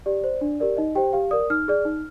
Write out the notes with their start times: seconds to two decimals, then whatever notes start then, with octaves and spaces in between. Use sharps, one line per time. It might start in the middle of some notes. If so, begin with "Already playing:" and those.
0.06 G4 D5
0.24 C5
0.41 D4
0.60 G4 A#4 D5
0.77 D#4 D#5
0.95 G4 C5 G5
1.13 G4 F5
1.31 A#4 D5 D#6
1.50 D#4 F6
1.68 G#4 D5
1.85 D#4